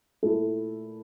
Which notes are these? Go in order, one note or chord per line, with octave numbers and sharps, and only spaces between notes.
A#2 A3 E4 A4